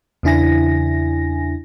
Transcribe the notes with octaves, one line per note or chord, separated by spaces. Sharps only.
E2 C#3 D4 E4 G#5 A#6